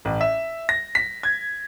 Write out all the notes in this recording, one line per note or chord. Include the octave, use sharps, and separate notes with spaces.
A1
E5
A#6
B6
G#6